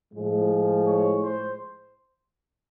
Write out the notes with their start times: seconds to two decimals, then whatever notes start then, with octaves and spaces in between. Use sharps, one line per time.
0.13 A2 F3 G#3
0.86 C#5
1.21 C5